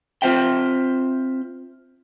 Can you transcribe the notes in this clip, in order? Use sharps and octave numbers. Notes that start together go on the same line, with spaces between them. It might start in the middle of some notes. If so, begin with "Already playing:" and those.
C4 F4 C5 E5 G5